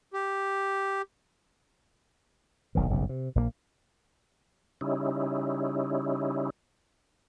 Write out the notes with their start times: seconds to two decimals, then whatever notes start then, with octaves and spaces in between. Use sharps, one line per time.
0.13 G4
2.75 D#1 B1 E2 D#3
2.90 F#1 B1 G2 C#3
3.09 C3
3.35 A#1 G3 A#3
4.81 C#3 G3 C#4 D#4 E4